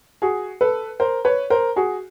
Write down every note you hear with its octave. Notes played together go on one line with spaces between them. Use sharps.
F#4 G#4
A4 B4
A#4 C5
B4 C#5
A#4 C5
F#4 G#4